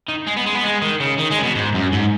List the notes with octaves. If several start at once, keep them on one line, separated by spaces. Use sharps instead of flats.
D#3
G#3
B3
G#3
B3
G#3
D#3
C#3
D#3
G#3
C#3
B2
G#2
F#2
G#2